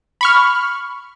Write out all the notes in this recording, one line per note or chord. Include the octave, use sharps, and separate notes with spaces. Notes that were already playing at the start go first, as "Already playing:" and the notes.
B5 C#6 F6